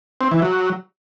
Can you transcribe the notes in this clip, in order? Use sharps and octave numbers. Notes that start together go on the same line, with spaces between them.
C4
E3
F#3